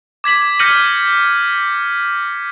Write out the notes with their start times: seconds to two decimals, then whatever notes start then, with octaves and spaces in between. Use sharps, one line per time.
0.24 D6 G#6 B6 F#7
0.59 F6 G6 A#6 C#7 D#7 F#7